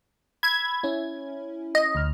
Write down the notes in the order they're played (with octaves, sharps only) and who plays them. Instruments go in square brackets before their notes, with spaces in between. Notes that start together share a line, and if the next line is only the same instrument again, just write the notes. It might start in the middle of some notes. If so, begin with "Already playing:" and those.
[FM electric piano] B5 E6 [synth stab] G#6
[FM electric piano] C#4 E4
[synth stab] D#5
[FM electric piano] D2 F6